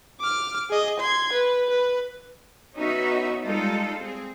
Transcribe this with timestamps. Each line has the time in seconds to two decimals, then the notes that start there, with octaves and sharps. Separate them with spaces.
0.20 D6 F6
0.69 G#4 D#5
1.00 C6 G#6
1.33 B4
1.70 B4
2.75 B3 C#4 D#4 F#4 E5
3.43 G3 G#3 D#4 F4 A4
3.99 C4 G#4